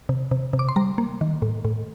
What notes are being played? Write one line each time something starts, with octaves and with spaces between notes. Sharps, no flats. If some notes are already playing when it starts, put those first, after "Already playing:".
C3
C3
C3
D6
C6
G3 A#5
A#3
D#3
A2
A2